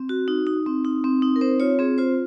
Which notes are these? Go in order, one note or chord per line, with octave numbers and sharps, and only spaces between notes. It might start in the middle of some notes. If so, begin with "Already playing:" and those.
Already playing: C4
F#4
D#4
D#4
C4
D#4
C4
D#4
A#4
C4 C5
F4 C#5
C4 G#4
F4 C5